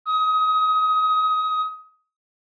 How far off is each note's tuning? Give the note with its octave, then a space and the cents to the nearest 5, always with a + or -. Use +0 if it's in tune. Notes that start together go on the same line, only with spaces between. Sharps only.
D#6 +25